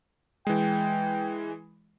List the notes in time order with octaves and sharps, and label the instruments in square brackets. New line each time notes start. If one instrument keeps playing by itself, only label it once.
[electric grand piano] E3 G#3 [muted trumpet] G5